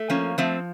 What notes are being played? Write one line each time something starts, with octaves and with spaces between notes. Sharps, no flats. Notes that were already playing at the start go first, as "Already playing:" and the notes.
Already playing: A3
F3 A#3 C#4
F3 A3 C4